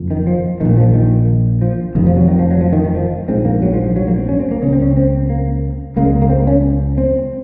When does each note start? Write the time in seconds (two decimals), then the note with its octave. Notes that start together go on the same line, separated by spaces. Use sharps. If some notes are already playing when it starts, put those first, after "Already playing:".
Already playing: F#1 F2
0.11 D#3
0.27 F3
0.60 A#1 A#2 D#3
0.77 F3
0.94 D#3
1.62 F3
1.95 F1 F2 C3 D#3
2.06 F3
2.17 F#3
2.28 D#3
2.39 F3
2.51 F#3
2.61 F3
2.72 D#3
2.85 D#3
2.95 F3
3.28 A#1 G#2 C4
3.45 A#3
3.62 F#3
3.74 F3
3.84 F3
3.96 F#3
4.07 A#3
4.18 C4
4.29 C#4
4.40 C4
4.51 A#3
4.62 C#3 C#4
4.67 C#2
4.73 C4
4.82 C#4
4.97 C4
5.30 A#3
5.96 C#2 C#3 A#3
6.05 G#3
6.22 A#3
6.30 C4
6.47 C#4
6.98 C4